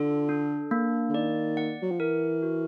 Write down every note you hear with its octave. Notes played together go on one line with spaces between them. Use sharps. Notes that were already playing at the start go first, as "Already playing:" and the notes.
Already playing: D3 F4 A4
D4
A#3
D3
D#3 D5
F#5
F#3
F3
E3 A#4
F#4